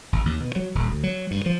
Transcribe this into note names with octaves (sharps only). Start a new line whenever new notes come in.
G#1
D#2
B2
F#3
D#1
D2
F#3
G2
F3